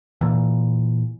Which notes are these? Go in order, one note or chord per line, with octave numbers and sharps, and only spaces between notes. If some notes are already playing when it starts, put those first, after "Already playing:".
A#2 E3